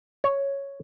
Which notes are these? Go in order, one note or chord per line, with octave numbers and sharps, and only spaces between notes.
C#5